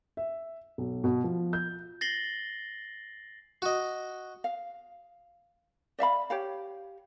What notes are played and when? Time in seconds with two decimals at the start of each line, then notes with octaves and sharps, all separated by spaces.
0.17 E5
0.78 B1
1.04 B2
1.24 F3
1.53 G6
2.01 A6 A#6 C7 F#7 G7
3.62 F#4 D#5
4.44 F5
5.99 D5 E5 F5 B5
6.30 G4 C#5 F5